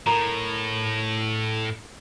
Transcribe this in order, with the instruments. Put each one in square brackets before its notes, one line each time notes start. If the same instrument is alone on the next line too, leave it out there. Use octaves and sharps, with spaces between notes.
[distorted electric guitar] A2 [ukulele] A#4